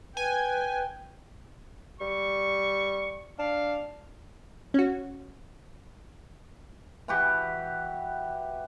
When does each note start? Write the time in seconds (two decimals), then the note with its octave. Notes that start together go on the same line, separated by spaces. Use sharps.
0.17 B4 G5 G#5
2.01 G3 C#6
3.39 D4 F5
4.74 C#4 F#4
7.08 E3 F#4 G4